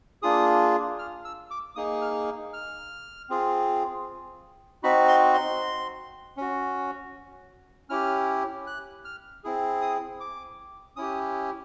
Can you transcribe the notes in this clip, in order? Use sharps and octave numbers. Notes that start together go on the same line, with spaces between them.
A#3 D4 F4 G#4 D#6
F6
E6
D6
A#3 D#4 G#4 D#6
F6
F6
C4 F4 G#4
C4 D#4 F#4 B5
C6
C6
C#4 F#4
C#4 E4 G4 F6
F#6
F6
C4 E4 G#4
D#6
D6
C#4 E4 G4 D#6